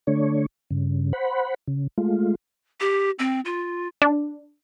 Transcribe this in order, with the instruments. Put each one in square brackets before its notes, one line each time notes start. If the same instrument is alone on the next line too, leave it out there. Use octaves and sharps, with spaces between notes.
[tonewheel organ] D3 A3 D4 C#5
G2 C#3
C5 F#5 B5
C#3
G#3 A3 F4
[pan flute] G4
C4
F4
[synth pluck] D4